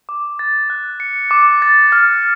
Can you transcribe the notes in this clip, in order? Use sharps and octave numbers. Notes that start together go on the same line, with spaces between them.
D6
A6
F#6
C#7
D6
A6
F6